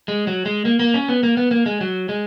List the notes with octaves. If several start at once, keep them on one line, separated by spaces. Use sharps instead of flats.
G#3
F#3
G#3
A#3
A#3
C#4
B3
A#3
B3
A#3
G#3
F#3
G#3